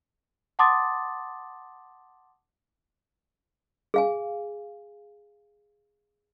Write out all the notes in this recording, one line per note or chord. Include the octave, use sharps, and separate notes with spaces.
F#5 A5 C6 D6 D#6 A6
G#4 F5 G#5